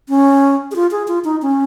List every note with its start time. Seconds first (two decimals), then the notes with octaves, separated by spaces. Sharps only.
0.09 C#4
0.71 G#4
0.76 F4
0.91 G#4
1.08 F4
1.25 D#4
1.42 C#4